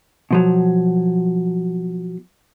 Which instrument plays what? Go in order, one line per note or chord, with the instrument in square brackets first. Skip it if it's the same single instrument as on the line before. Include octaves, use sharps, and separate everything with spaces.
[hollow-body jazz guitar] B2 F3 F#3